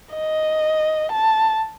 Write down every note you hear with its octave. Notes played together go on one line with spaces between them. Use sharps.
D#5
A5